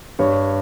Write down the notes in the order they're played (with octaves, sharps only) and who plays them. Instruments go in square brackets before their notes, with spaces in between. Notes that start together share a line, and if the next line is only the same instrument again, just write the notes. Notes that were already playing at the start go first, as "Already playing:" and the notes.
[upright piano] G2 C#5